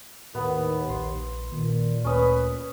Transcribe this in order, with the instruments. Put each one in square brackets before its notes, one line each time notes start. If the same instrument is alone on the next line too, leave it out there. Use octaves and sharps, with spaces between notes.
[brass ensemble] D#2 [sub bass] A2 [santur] B3
[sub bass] A#1 [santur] C6
[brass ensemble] A#2 [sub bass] D#3
[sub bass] D2 [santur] C#4 D#6 [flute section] B4